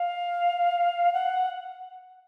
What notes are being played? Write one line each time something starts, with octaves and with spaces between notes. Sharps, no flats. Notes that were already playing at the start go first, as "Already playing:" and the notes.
Already playing: F5
F#5